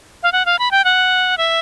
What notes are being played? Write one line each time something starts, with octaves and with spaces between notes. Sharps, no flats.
F5
F#5
F5
B5
G5
F#5
E5